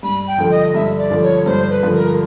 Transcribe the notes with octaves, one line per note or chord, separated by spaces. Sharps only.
G2 B5
G5
D3 F3
D#5
G2 E5
D5
D3 F3
C#5
G2 C5
B4
D3 F3
A#4